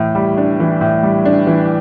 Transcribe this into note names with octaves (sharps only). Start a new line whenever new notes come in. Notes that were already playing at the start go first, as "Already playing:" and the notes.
Already playing: A2 E3
G3
D4
E3
A2
G3
D4
E3